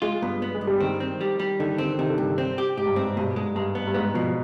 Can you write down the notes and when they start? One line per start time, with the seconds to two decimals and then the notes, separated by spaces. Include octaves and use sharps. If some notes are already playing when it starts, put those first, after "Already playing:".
0.02 G#3 F4
0.22 G2 B3
0.42 B3
0.54 G#3
0.61 G2
0.67 G3
0.80 D#3 C4
1.00 C4
1.21 G3
1.40 G3
1.59 D3 D#3
1.78 D3 C4
1.98 C3 D#3
2.08 D3
2.18 G2 C3
2.38 C4
2.58 G4
2.77 G#2 G4
2.87 G2
2.96 G#2 C4
3.17 G2 B2
3.36 G#2 G#3
3.55 G2 G#3
3.75 B3
3.87 G2
3.94 G#2 B3
4.14 B2 F3